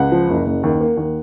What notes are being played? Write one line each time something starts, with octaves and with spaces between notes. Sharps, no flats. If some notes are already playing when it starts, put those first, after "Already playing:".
Already playing: C#2 F#5
F3
F#1
F#1
D#2
A#3
D#2